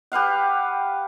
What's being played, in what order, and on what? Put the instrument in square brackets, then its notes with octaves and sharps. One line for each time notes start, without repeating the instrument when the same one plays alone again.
[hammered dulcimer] G4 B4 F5 F#5